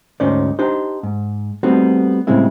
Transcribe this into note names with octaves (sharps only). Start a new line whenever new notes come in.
D2 G#2 C#4 D#4 C5 D5
D4 D#4 G4 C5
G#2
G3 A3 B3 C4 D#4 F#4
A2 C#3 G3 G#3 C4 E4